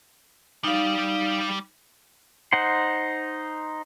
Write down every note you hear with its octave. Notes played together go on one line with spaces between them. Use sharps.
G3 D#4 D5 F5
D#4 C5 F#5 C6